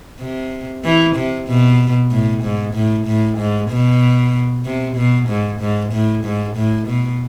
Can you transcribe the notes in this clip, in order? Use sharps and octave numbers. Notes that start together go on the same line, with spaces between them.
C3
E3
C3
B2
A2
G#2
A2
A2
G#2
B2
C3
B2
G#2
G#2
A2
G#2
A2
B2